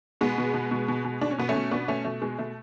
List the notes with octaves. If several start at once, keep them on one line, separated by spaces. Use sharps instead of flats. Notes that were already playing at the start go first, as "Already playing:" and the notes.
B2 G#3 B3
B2
B2
B2
B2
B2
B2 D4
C#4
B2 B3
A3 C#4
B2
B2 B3 D4
B2 A3 C#4
B2 A3
B2 G#3
B2 A3